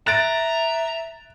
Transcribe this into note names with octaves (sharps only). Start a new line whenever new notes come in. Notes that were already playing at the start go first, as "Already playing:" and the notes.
E5 A#5 F#6 A6 D7